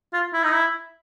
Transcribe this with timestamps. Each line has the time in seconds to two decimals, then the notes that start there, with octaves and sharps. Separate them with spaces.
0.13 F4
0.33 E4
0.43 D#4
0.53 E4